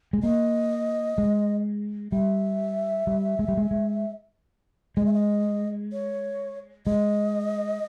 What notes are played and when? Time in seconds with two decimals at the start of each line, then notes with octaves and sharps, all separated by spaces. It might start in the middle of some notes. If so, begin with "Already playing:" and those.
0.13 G#3
0.23 A#3 D#5
1.18 G#3
2.12 G3 E5
3.07 G3
3.39 G#3
3.48 G3
3.57 G#3
3.71 G#3
4.97 G#3 D#5
5.06 E5
5.14 D#5
5.92 C#5
6.86 G#3 D#5